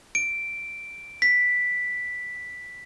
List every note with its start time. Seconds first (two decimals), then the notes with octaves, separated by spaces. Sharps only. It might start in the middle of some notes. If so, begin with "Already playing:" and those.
0.15 D7
1.22 B6